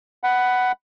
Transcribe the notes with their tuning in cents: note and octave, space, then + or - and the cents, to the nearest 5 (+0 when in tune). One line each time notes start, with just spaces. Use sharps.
F#5 +10 B5 +0